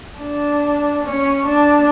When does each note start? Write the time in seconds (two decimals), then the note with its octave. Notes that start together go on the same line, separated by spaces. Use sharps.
0.19 D4
1.04 C#4
1.46 D4